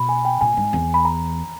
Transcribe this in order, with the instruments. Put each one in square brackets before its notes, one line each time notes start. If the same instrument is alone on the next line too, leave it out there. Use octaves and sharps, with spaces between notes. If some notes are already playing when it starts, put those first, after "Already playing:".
Already playing: [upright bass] B2 [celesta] B5
[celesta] G#5
G5
[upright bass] A#2 [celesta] G#5
[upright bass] G#2
E2
[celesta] B5
A#5